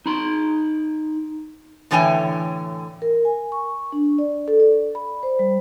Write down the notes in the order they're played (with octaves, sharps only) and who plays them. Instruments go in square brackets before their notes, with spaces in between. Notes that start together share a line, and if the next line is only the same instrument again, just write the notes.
[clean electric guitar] D#4 B5 C6
[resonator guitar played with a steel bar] A2 D3 E3 C#5 G5 G#5
[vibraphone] A#4
G#5
C#6
D4
D5
A4
D5
B5
C5
G3